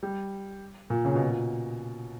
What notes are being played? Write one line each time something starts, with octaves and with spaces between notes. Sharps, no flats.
G3
A#2
C#3
B2
A#2